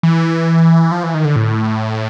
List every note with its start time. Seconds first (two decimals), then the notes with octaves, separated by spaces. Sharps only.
0.03 E3
0.92 F3
1.03 E3
1.14 D#3
1.25 D3
1.36 A2